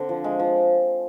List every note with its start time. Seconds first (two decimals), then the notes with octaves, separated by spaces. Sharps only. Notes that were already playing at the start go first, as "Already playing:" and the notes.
Already playing: D3 C4
0.09 F3
0.24 G#3
0.39 F3